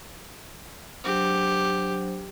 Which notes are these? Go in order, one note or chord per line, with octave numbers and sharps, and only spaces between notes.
F#3 D4 G4 C5